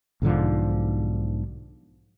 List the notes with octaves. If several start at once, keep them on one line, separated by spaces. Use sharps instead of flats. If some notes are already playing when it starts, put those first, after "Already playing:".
B1 G#2 D3 F3